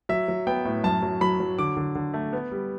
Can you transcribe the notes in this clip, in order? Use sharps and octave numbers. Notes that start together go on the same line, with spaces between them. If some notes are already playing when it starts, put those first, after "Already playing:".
F#3 E5
F#3
B3 G5
A2
F#2 A5
F#3
F#3 B5
F#3
D3 D6
D3
D3
A3
B3
G3